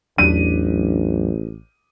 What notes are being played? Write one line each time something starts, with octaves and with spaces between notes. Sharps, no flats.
A1 E2 F#3 D4 D#7